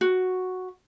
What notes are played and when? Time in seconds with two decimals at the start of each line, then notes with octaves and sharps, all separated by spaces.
0.01 F#4